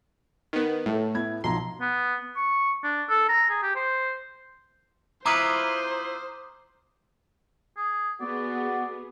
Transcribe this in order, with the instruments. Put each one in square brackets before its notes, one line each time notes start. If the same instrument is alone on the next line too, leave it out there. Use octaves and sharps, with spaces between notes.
[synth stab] D#3 B3
[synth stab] A2 [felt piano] A3 A4
[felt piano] B3 E4 G#6
[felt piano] B1 F3 A#5 [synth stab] C6
[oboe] B3
C#6
D4
A4
A#5
G#4
G4
C5
[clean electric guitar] E4 F4 B4 [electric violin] C5 [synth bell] A#5 D6 D#6
[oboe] G#4
[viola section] B3 G#4 [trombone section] F#4 [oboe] D5